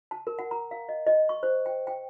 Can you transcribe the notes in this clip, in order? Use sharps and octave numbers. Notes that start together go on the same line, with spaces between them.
A5
A#4
F#5
A#5
F5
D#5
D#5
C#6
C5
G5
G5